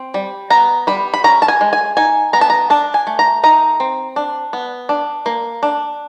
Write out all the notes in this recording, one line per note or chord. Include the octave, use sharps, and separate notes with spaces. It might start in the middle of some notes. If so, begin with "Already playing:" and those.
Already playing: C4
G3
B3 A#5
G3 B5
B5
C#4 A#5
A5
G#5
G#3
G#5
D#4 G#5
B3 A#5
A5
A#5
D4 A5
G#5
A3
A#5
D#4 A#5
C4
D4
B3
D4
A#3
D4